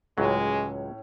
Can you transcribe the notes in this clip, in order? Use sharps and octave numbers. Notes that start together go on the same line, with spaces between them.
C#2 A2 F#3 G#3 C#4